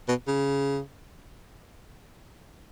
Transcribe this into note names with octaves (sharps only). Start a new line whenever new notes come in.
B2
C#3